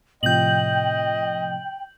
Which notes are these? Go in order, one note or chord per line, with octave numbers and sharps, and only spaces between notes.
A2 C3 F3 D#5 G5 G6 F#7